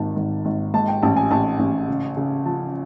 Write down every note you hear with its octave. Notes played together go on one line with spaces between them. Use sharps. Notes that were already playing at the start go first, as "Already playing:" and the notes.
Already playing: G#1 D#3 A5
G#1
G#1
G#2 A5
G5
A1 A5
G#5
A1 A5
A1
C#3
C#3
F3 A5